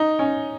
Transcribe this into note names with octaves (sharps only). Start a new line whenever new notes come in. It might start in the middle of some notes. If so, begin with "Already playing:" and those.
Already playing: D#4
C#4